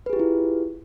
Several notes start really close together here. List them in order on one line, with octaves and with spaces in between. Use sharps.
B4 G#4 G4 F4 E4